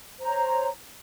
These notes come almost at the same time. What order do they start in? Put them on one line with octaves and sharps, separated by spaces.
C5 A#5 C#5